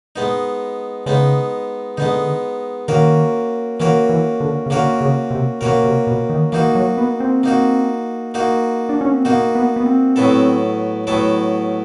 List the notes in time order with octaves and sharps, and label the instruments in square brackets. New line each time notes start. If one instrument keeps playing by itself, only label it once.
[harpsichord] G#3 B3 D#4
[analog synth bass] C#3 [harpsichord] G#3 B3 D#4
[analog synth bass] D3 [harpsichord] G#3 B3 D#4
[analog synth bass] D#3 [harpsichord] A#3 C#4 F#4 A#4
[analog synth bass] E3 [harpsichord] A#3 C#4 F#4 A#4
[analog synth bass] E3
D3
C#3
[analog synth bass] D3 [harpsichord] A#3 C#4 F#4 A#4
[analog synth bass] C#3
C3
[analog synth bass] B2 [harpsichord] A#3 C#4 F#4 A#4
[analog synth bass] C3
B2
D#3
[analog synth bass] E3 [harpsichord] A#3 D#4 F#4
[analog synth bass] F#3
B3
C4
[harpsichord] A#3 D#4 F#4
A#3 D#4 F#4
[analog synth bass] D4
C#4
C4
[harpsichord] A#3 D#4 F#4 [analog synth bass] B3
[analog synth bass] B3
B3
C4
[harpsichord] A2 F#3 B3 E4 A4
A2 F#3 B3 E4 A4